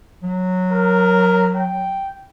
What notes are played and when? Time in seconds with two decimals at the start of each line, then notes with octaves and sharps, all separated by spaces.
0.23 F#3
0.72 A#4
1.56 G5